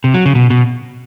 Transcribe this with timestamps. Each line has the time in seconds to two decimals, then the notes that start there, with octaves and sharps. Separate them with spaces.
0.04 C3
0.14 F#3
0.26 C#3
0.35 B2
0.50 B2